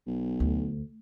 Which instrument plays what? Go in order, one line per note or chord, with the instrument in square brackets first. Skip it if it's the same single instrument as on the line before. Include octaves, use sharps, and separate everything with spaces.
[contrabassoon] B1
[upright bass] D2